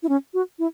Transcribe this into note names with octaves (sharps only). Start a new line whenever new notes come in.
E4
C#4
F#4
E4